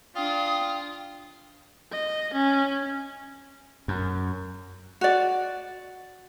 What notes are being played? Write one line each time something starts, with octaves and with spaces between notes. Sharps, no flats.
D4 F4 G5 D#6
D#5
C#4
F#2
F#4 D5